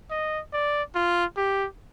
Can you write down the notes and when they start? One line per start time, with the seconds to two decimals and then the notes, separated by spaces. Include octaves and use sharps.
0.11 D#5
0.53 D5
0.95 F4
1.37 G4